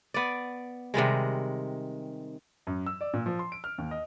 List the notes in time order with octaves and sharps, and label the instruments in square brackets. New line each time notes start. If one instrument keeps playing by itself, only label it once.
[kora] B3 D5
C3 D#3 G3 G#3
[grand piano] F#2
E6
D5
A#2
F3
C6
D7
F6
D#2
D#5